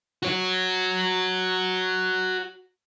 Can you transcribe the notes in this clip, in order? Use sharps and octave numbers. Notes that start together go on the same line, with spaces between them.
F#4 C#5